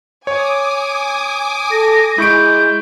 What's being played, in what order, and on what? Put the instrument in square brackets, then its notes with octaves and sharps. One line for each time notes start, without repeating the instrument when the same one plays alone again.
[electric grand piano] C#5 [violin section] G#5 D6 D#6
[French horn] A4 [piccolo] A#6
[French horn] G#3 [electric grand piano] E4 C#6 D7 [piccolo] G6